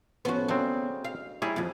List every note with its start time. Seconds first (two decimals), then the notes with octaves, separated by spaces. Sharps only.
0.25 A2 F3 B3 C#4 F#4
0.48 C#3 F#3 G#3 C4 D4
1.04 F5
1.42 G3 D#4 E4 G#4 C#5
1.56 F2 F3